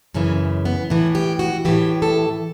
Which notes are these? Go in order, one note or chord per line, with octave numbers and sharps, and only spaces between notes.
F#2 C#3 E3 C#4
B3
A2 E3 E4
G4
F#4
A2 E3 G4
A4